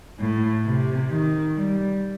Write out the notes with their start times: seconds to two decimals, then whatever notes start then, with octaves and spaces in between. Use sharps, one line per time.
0.19 A2
0.65 C3
1.09 D#3
1.54 G3